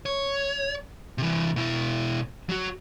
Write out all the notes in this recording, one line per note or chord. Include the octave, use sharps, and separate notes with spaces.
C#5
C3 E3
B2 E4
F#3 F#4